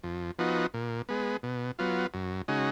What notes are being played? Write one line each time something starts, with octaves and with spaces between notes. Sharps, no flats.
F2
F3 B3 D#4 F#4
A#2
G#3 B3
B2
F#3 B3 F4
F#2
C#3 G#3 D#4 F#4